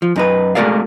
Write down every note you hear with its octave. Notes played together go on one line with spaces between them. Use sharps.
F3
F#2 D#4 B4
G#3 A3 F#4 A#4 D5 F5